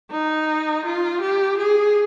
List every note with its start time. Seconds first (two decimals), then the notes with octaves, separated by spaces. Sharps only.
0.11 D#4
0.86 F4
1.22 G4
1.58 G#4